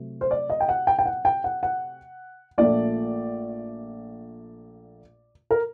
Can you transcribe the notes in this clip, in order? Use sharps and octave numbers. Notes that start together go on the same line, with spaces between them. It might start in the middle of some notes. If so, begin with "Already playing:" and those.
Already playing: C3 F#3 A3
C5
D5
D#5
G5
F#5
G5
G5
F#5
G5
F#5
F#5
A#1 A#2 A3 D5
A#4